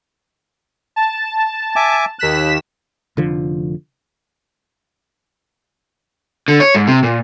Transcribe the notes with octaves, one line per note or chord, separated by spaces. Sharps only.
A5
E5 G#5 D6
D#2 F#6 B6 E7
F1 D3 F3
D3
C#5
G#2
C3
A#2